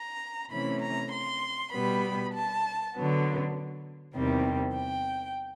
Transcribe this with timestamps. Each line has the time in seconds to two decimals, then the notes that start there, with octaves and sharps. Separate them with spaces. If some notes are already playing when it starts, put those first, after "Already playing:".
Already playing: A#5
0.51 C3 E3 A3 C#4 B5
0.81 A#5
1.12 C6
1.73 B2 G3 B3 B5
2.33 A5
2.94 D3 F#3 B3
4.15 E2 C3 D#3 G3 C4
4.75 G5